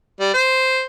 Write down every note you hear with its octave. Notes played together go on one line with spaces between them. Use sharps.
G3
C5